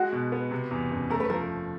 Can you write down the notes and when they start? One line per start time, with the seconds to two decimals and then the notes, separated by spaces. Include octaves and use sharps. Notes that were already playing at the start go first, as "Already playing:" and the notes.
Already playing: G#3 F#4
0.13 B2
0.32 B3
0.51 C3
0.71 E2
0.91 F#1
1.10 A3 A#4
1.20 B4
1.30 F3 A#4